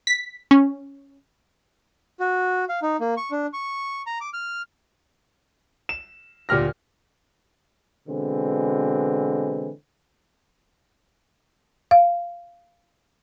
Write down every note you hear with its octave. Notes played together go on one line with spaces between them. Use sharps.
B6
C#4
F#4
F5
D#4
A#3
C#6
D4
C#6
A#5
D6
F6
E7
D2 A#2 G4 F6 A#6
B2 D3 E3 G#3 C4
F5